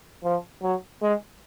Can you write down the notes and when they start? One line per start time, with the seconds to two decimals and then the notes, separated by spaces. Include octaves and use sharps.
0.24 F3
0.62 F#3
1.02 G#3